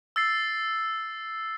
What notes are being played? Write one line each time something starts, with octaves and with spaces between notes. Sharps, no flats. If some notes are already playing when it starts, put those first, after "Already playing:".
E6 A6 C7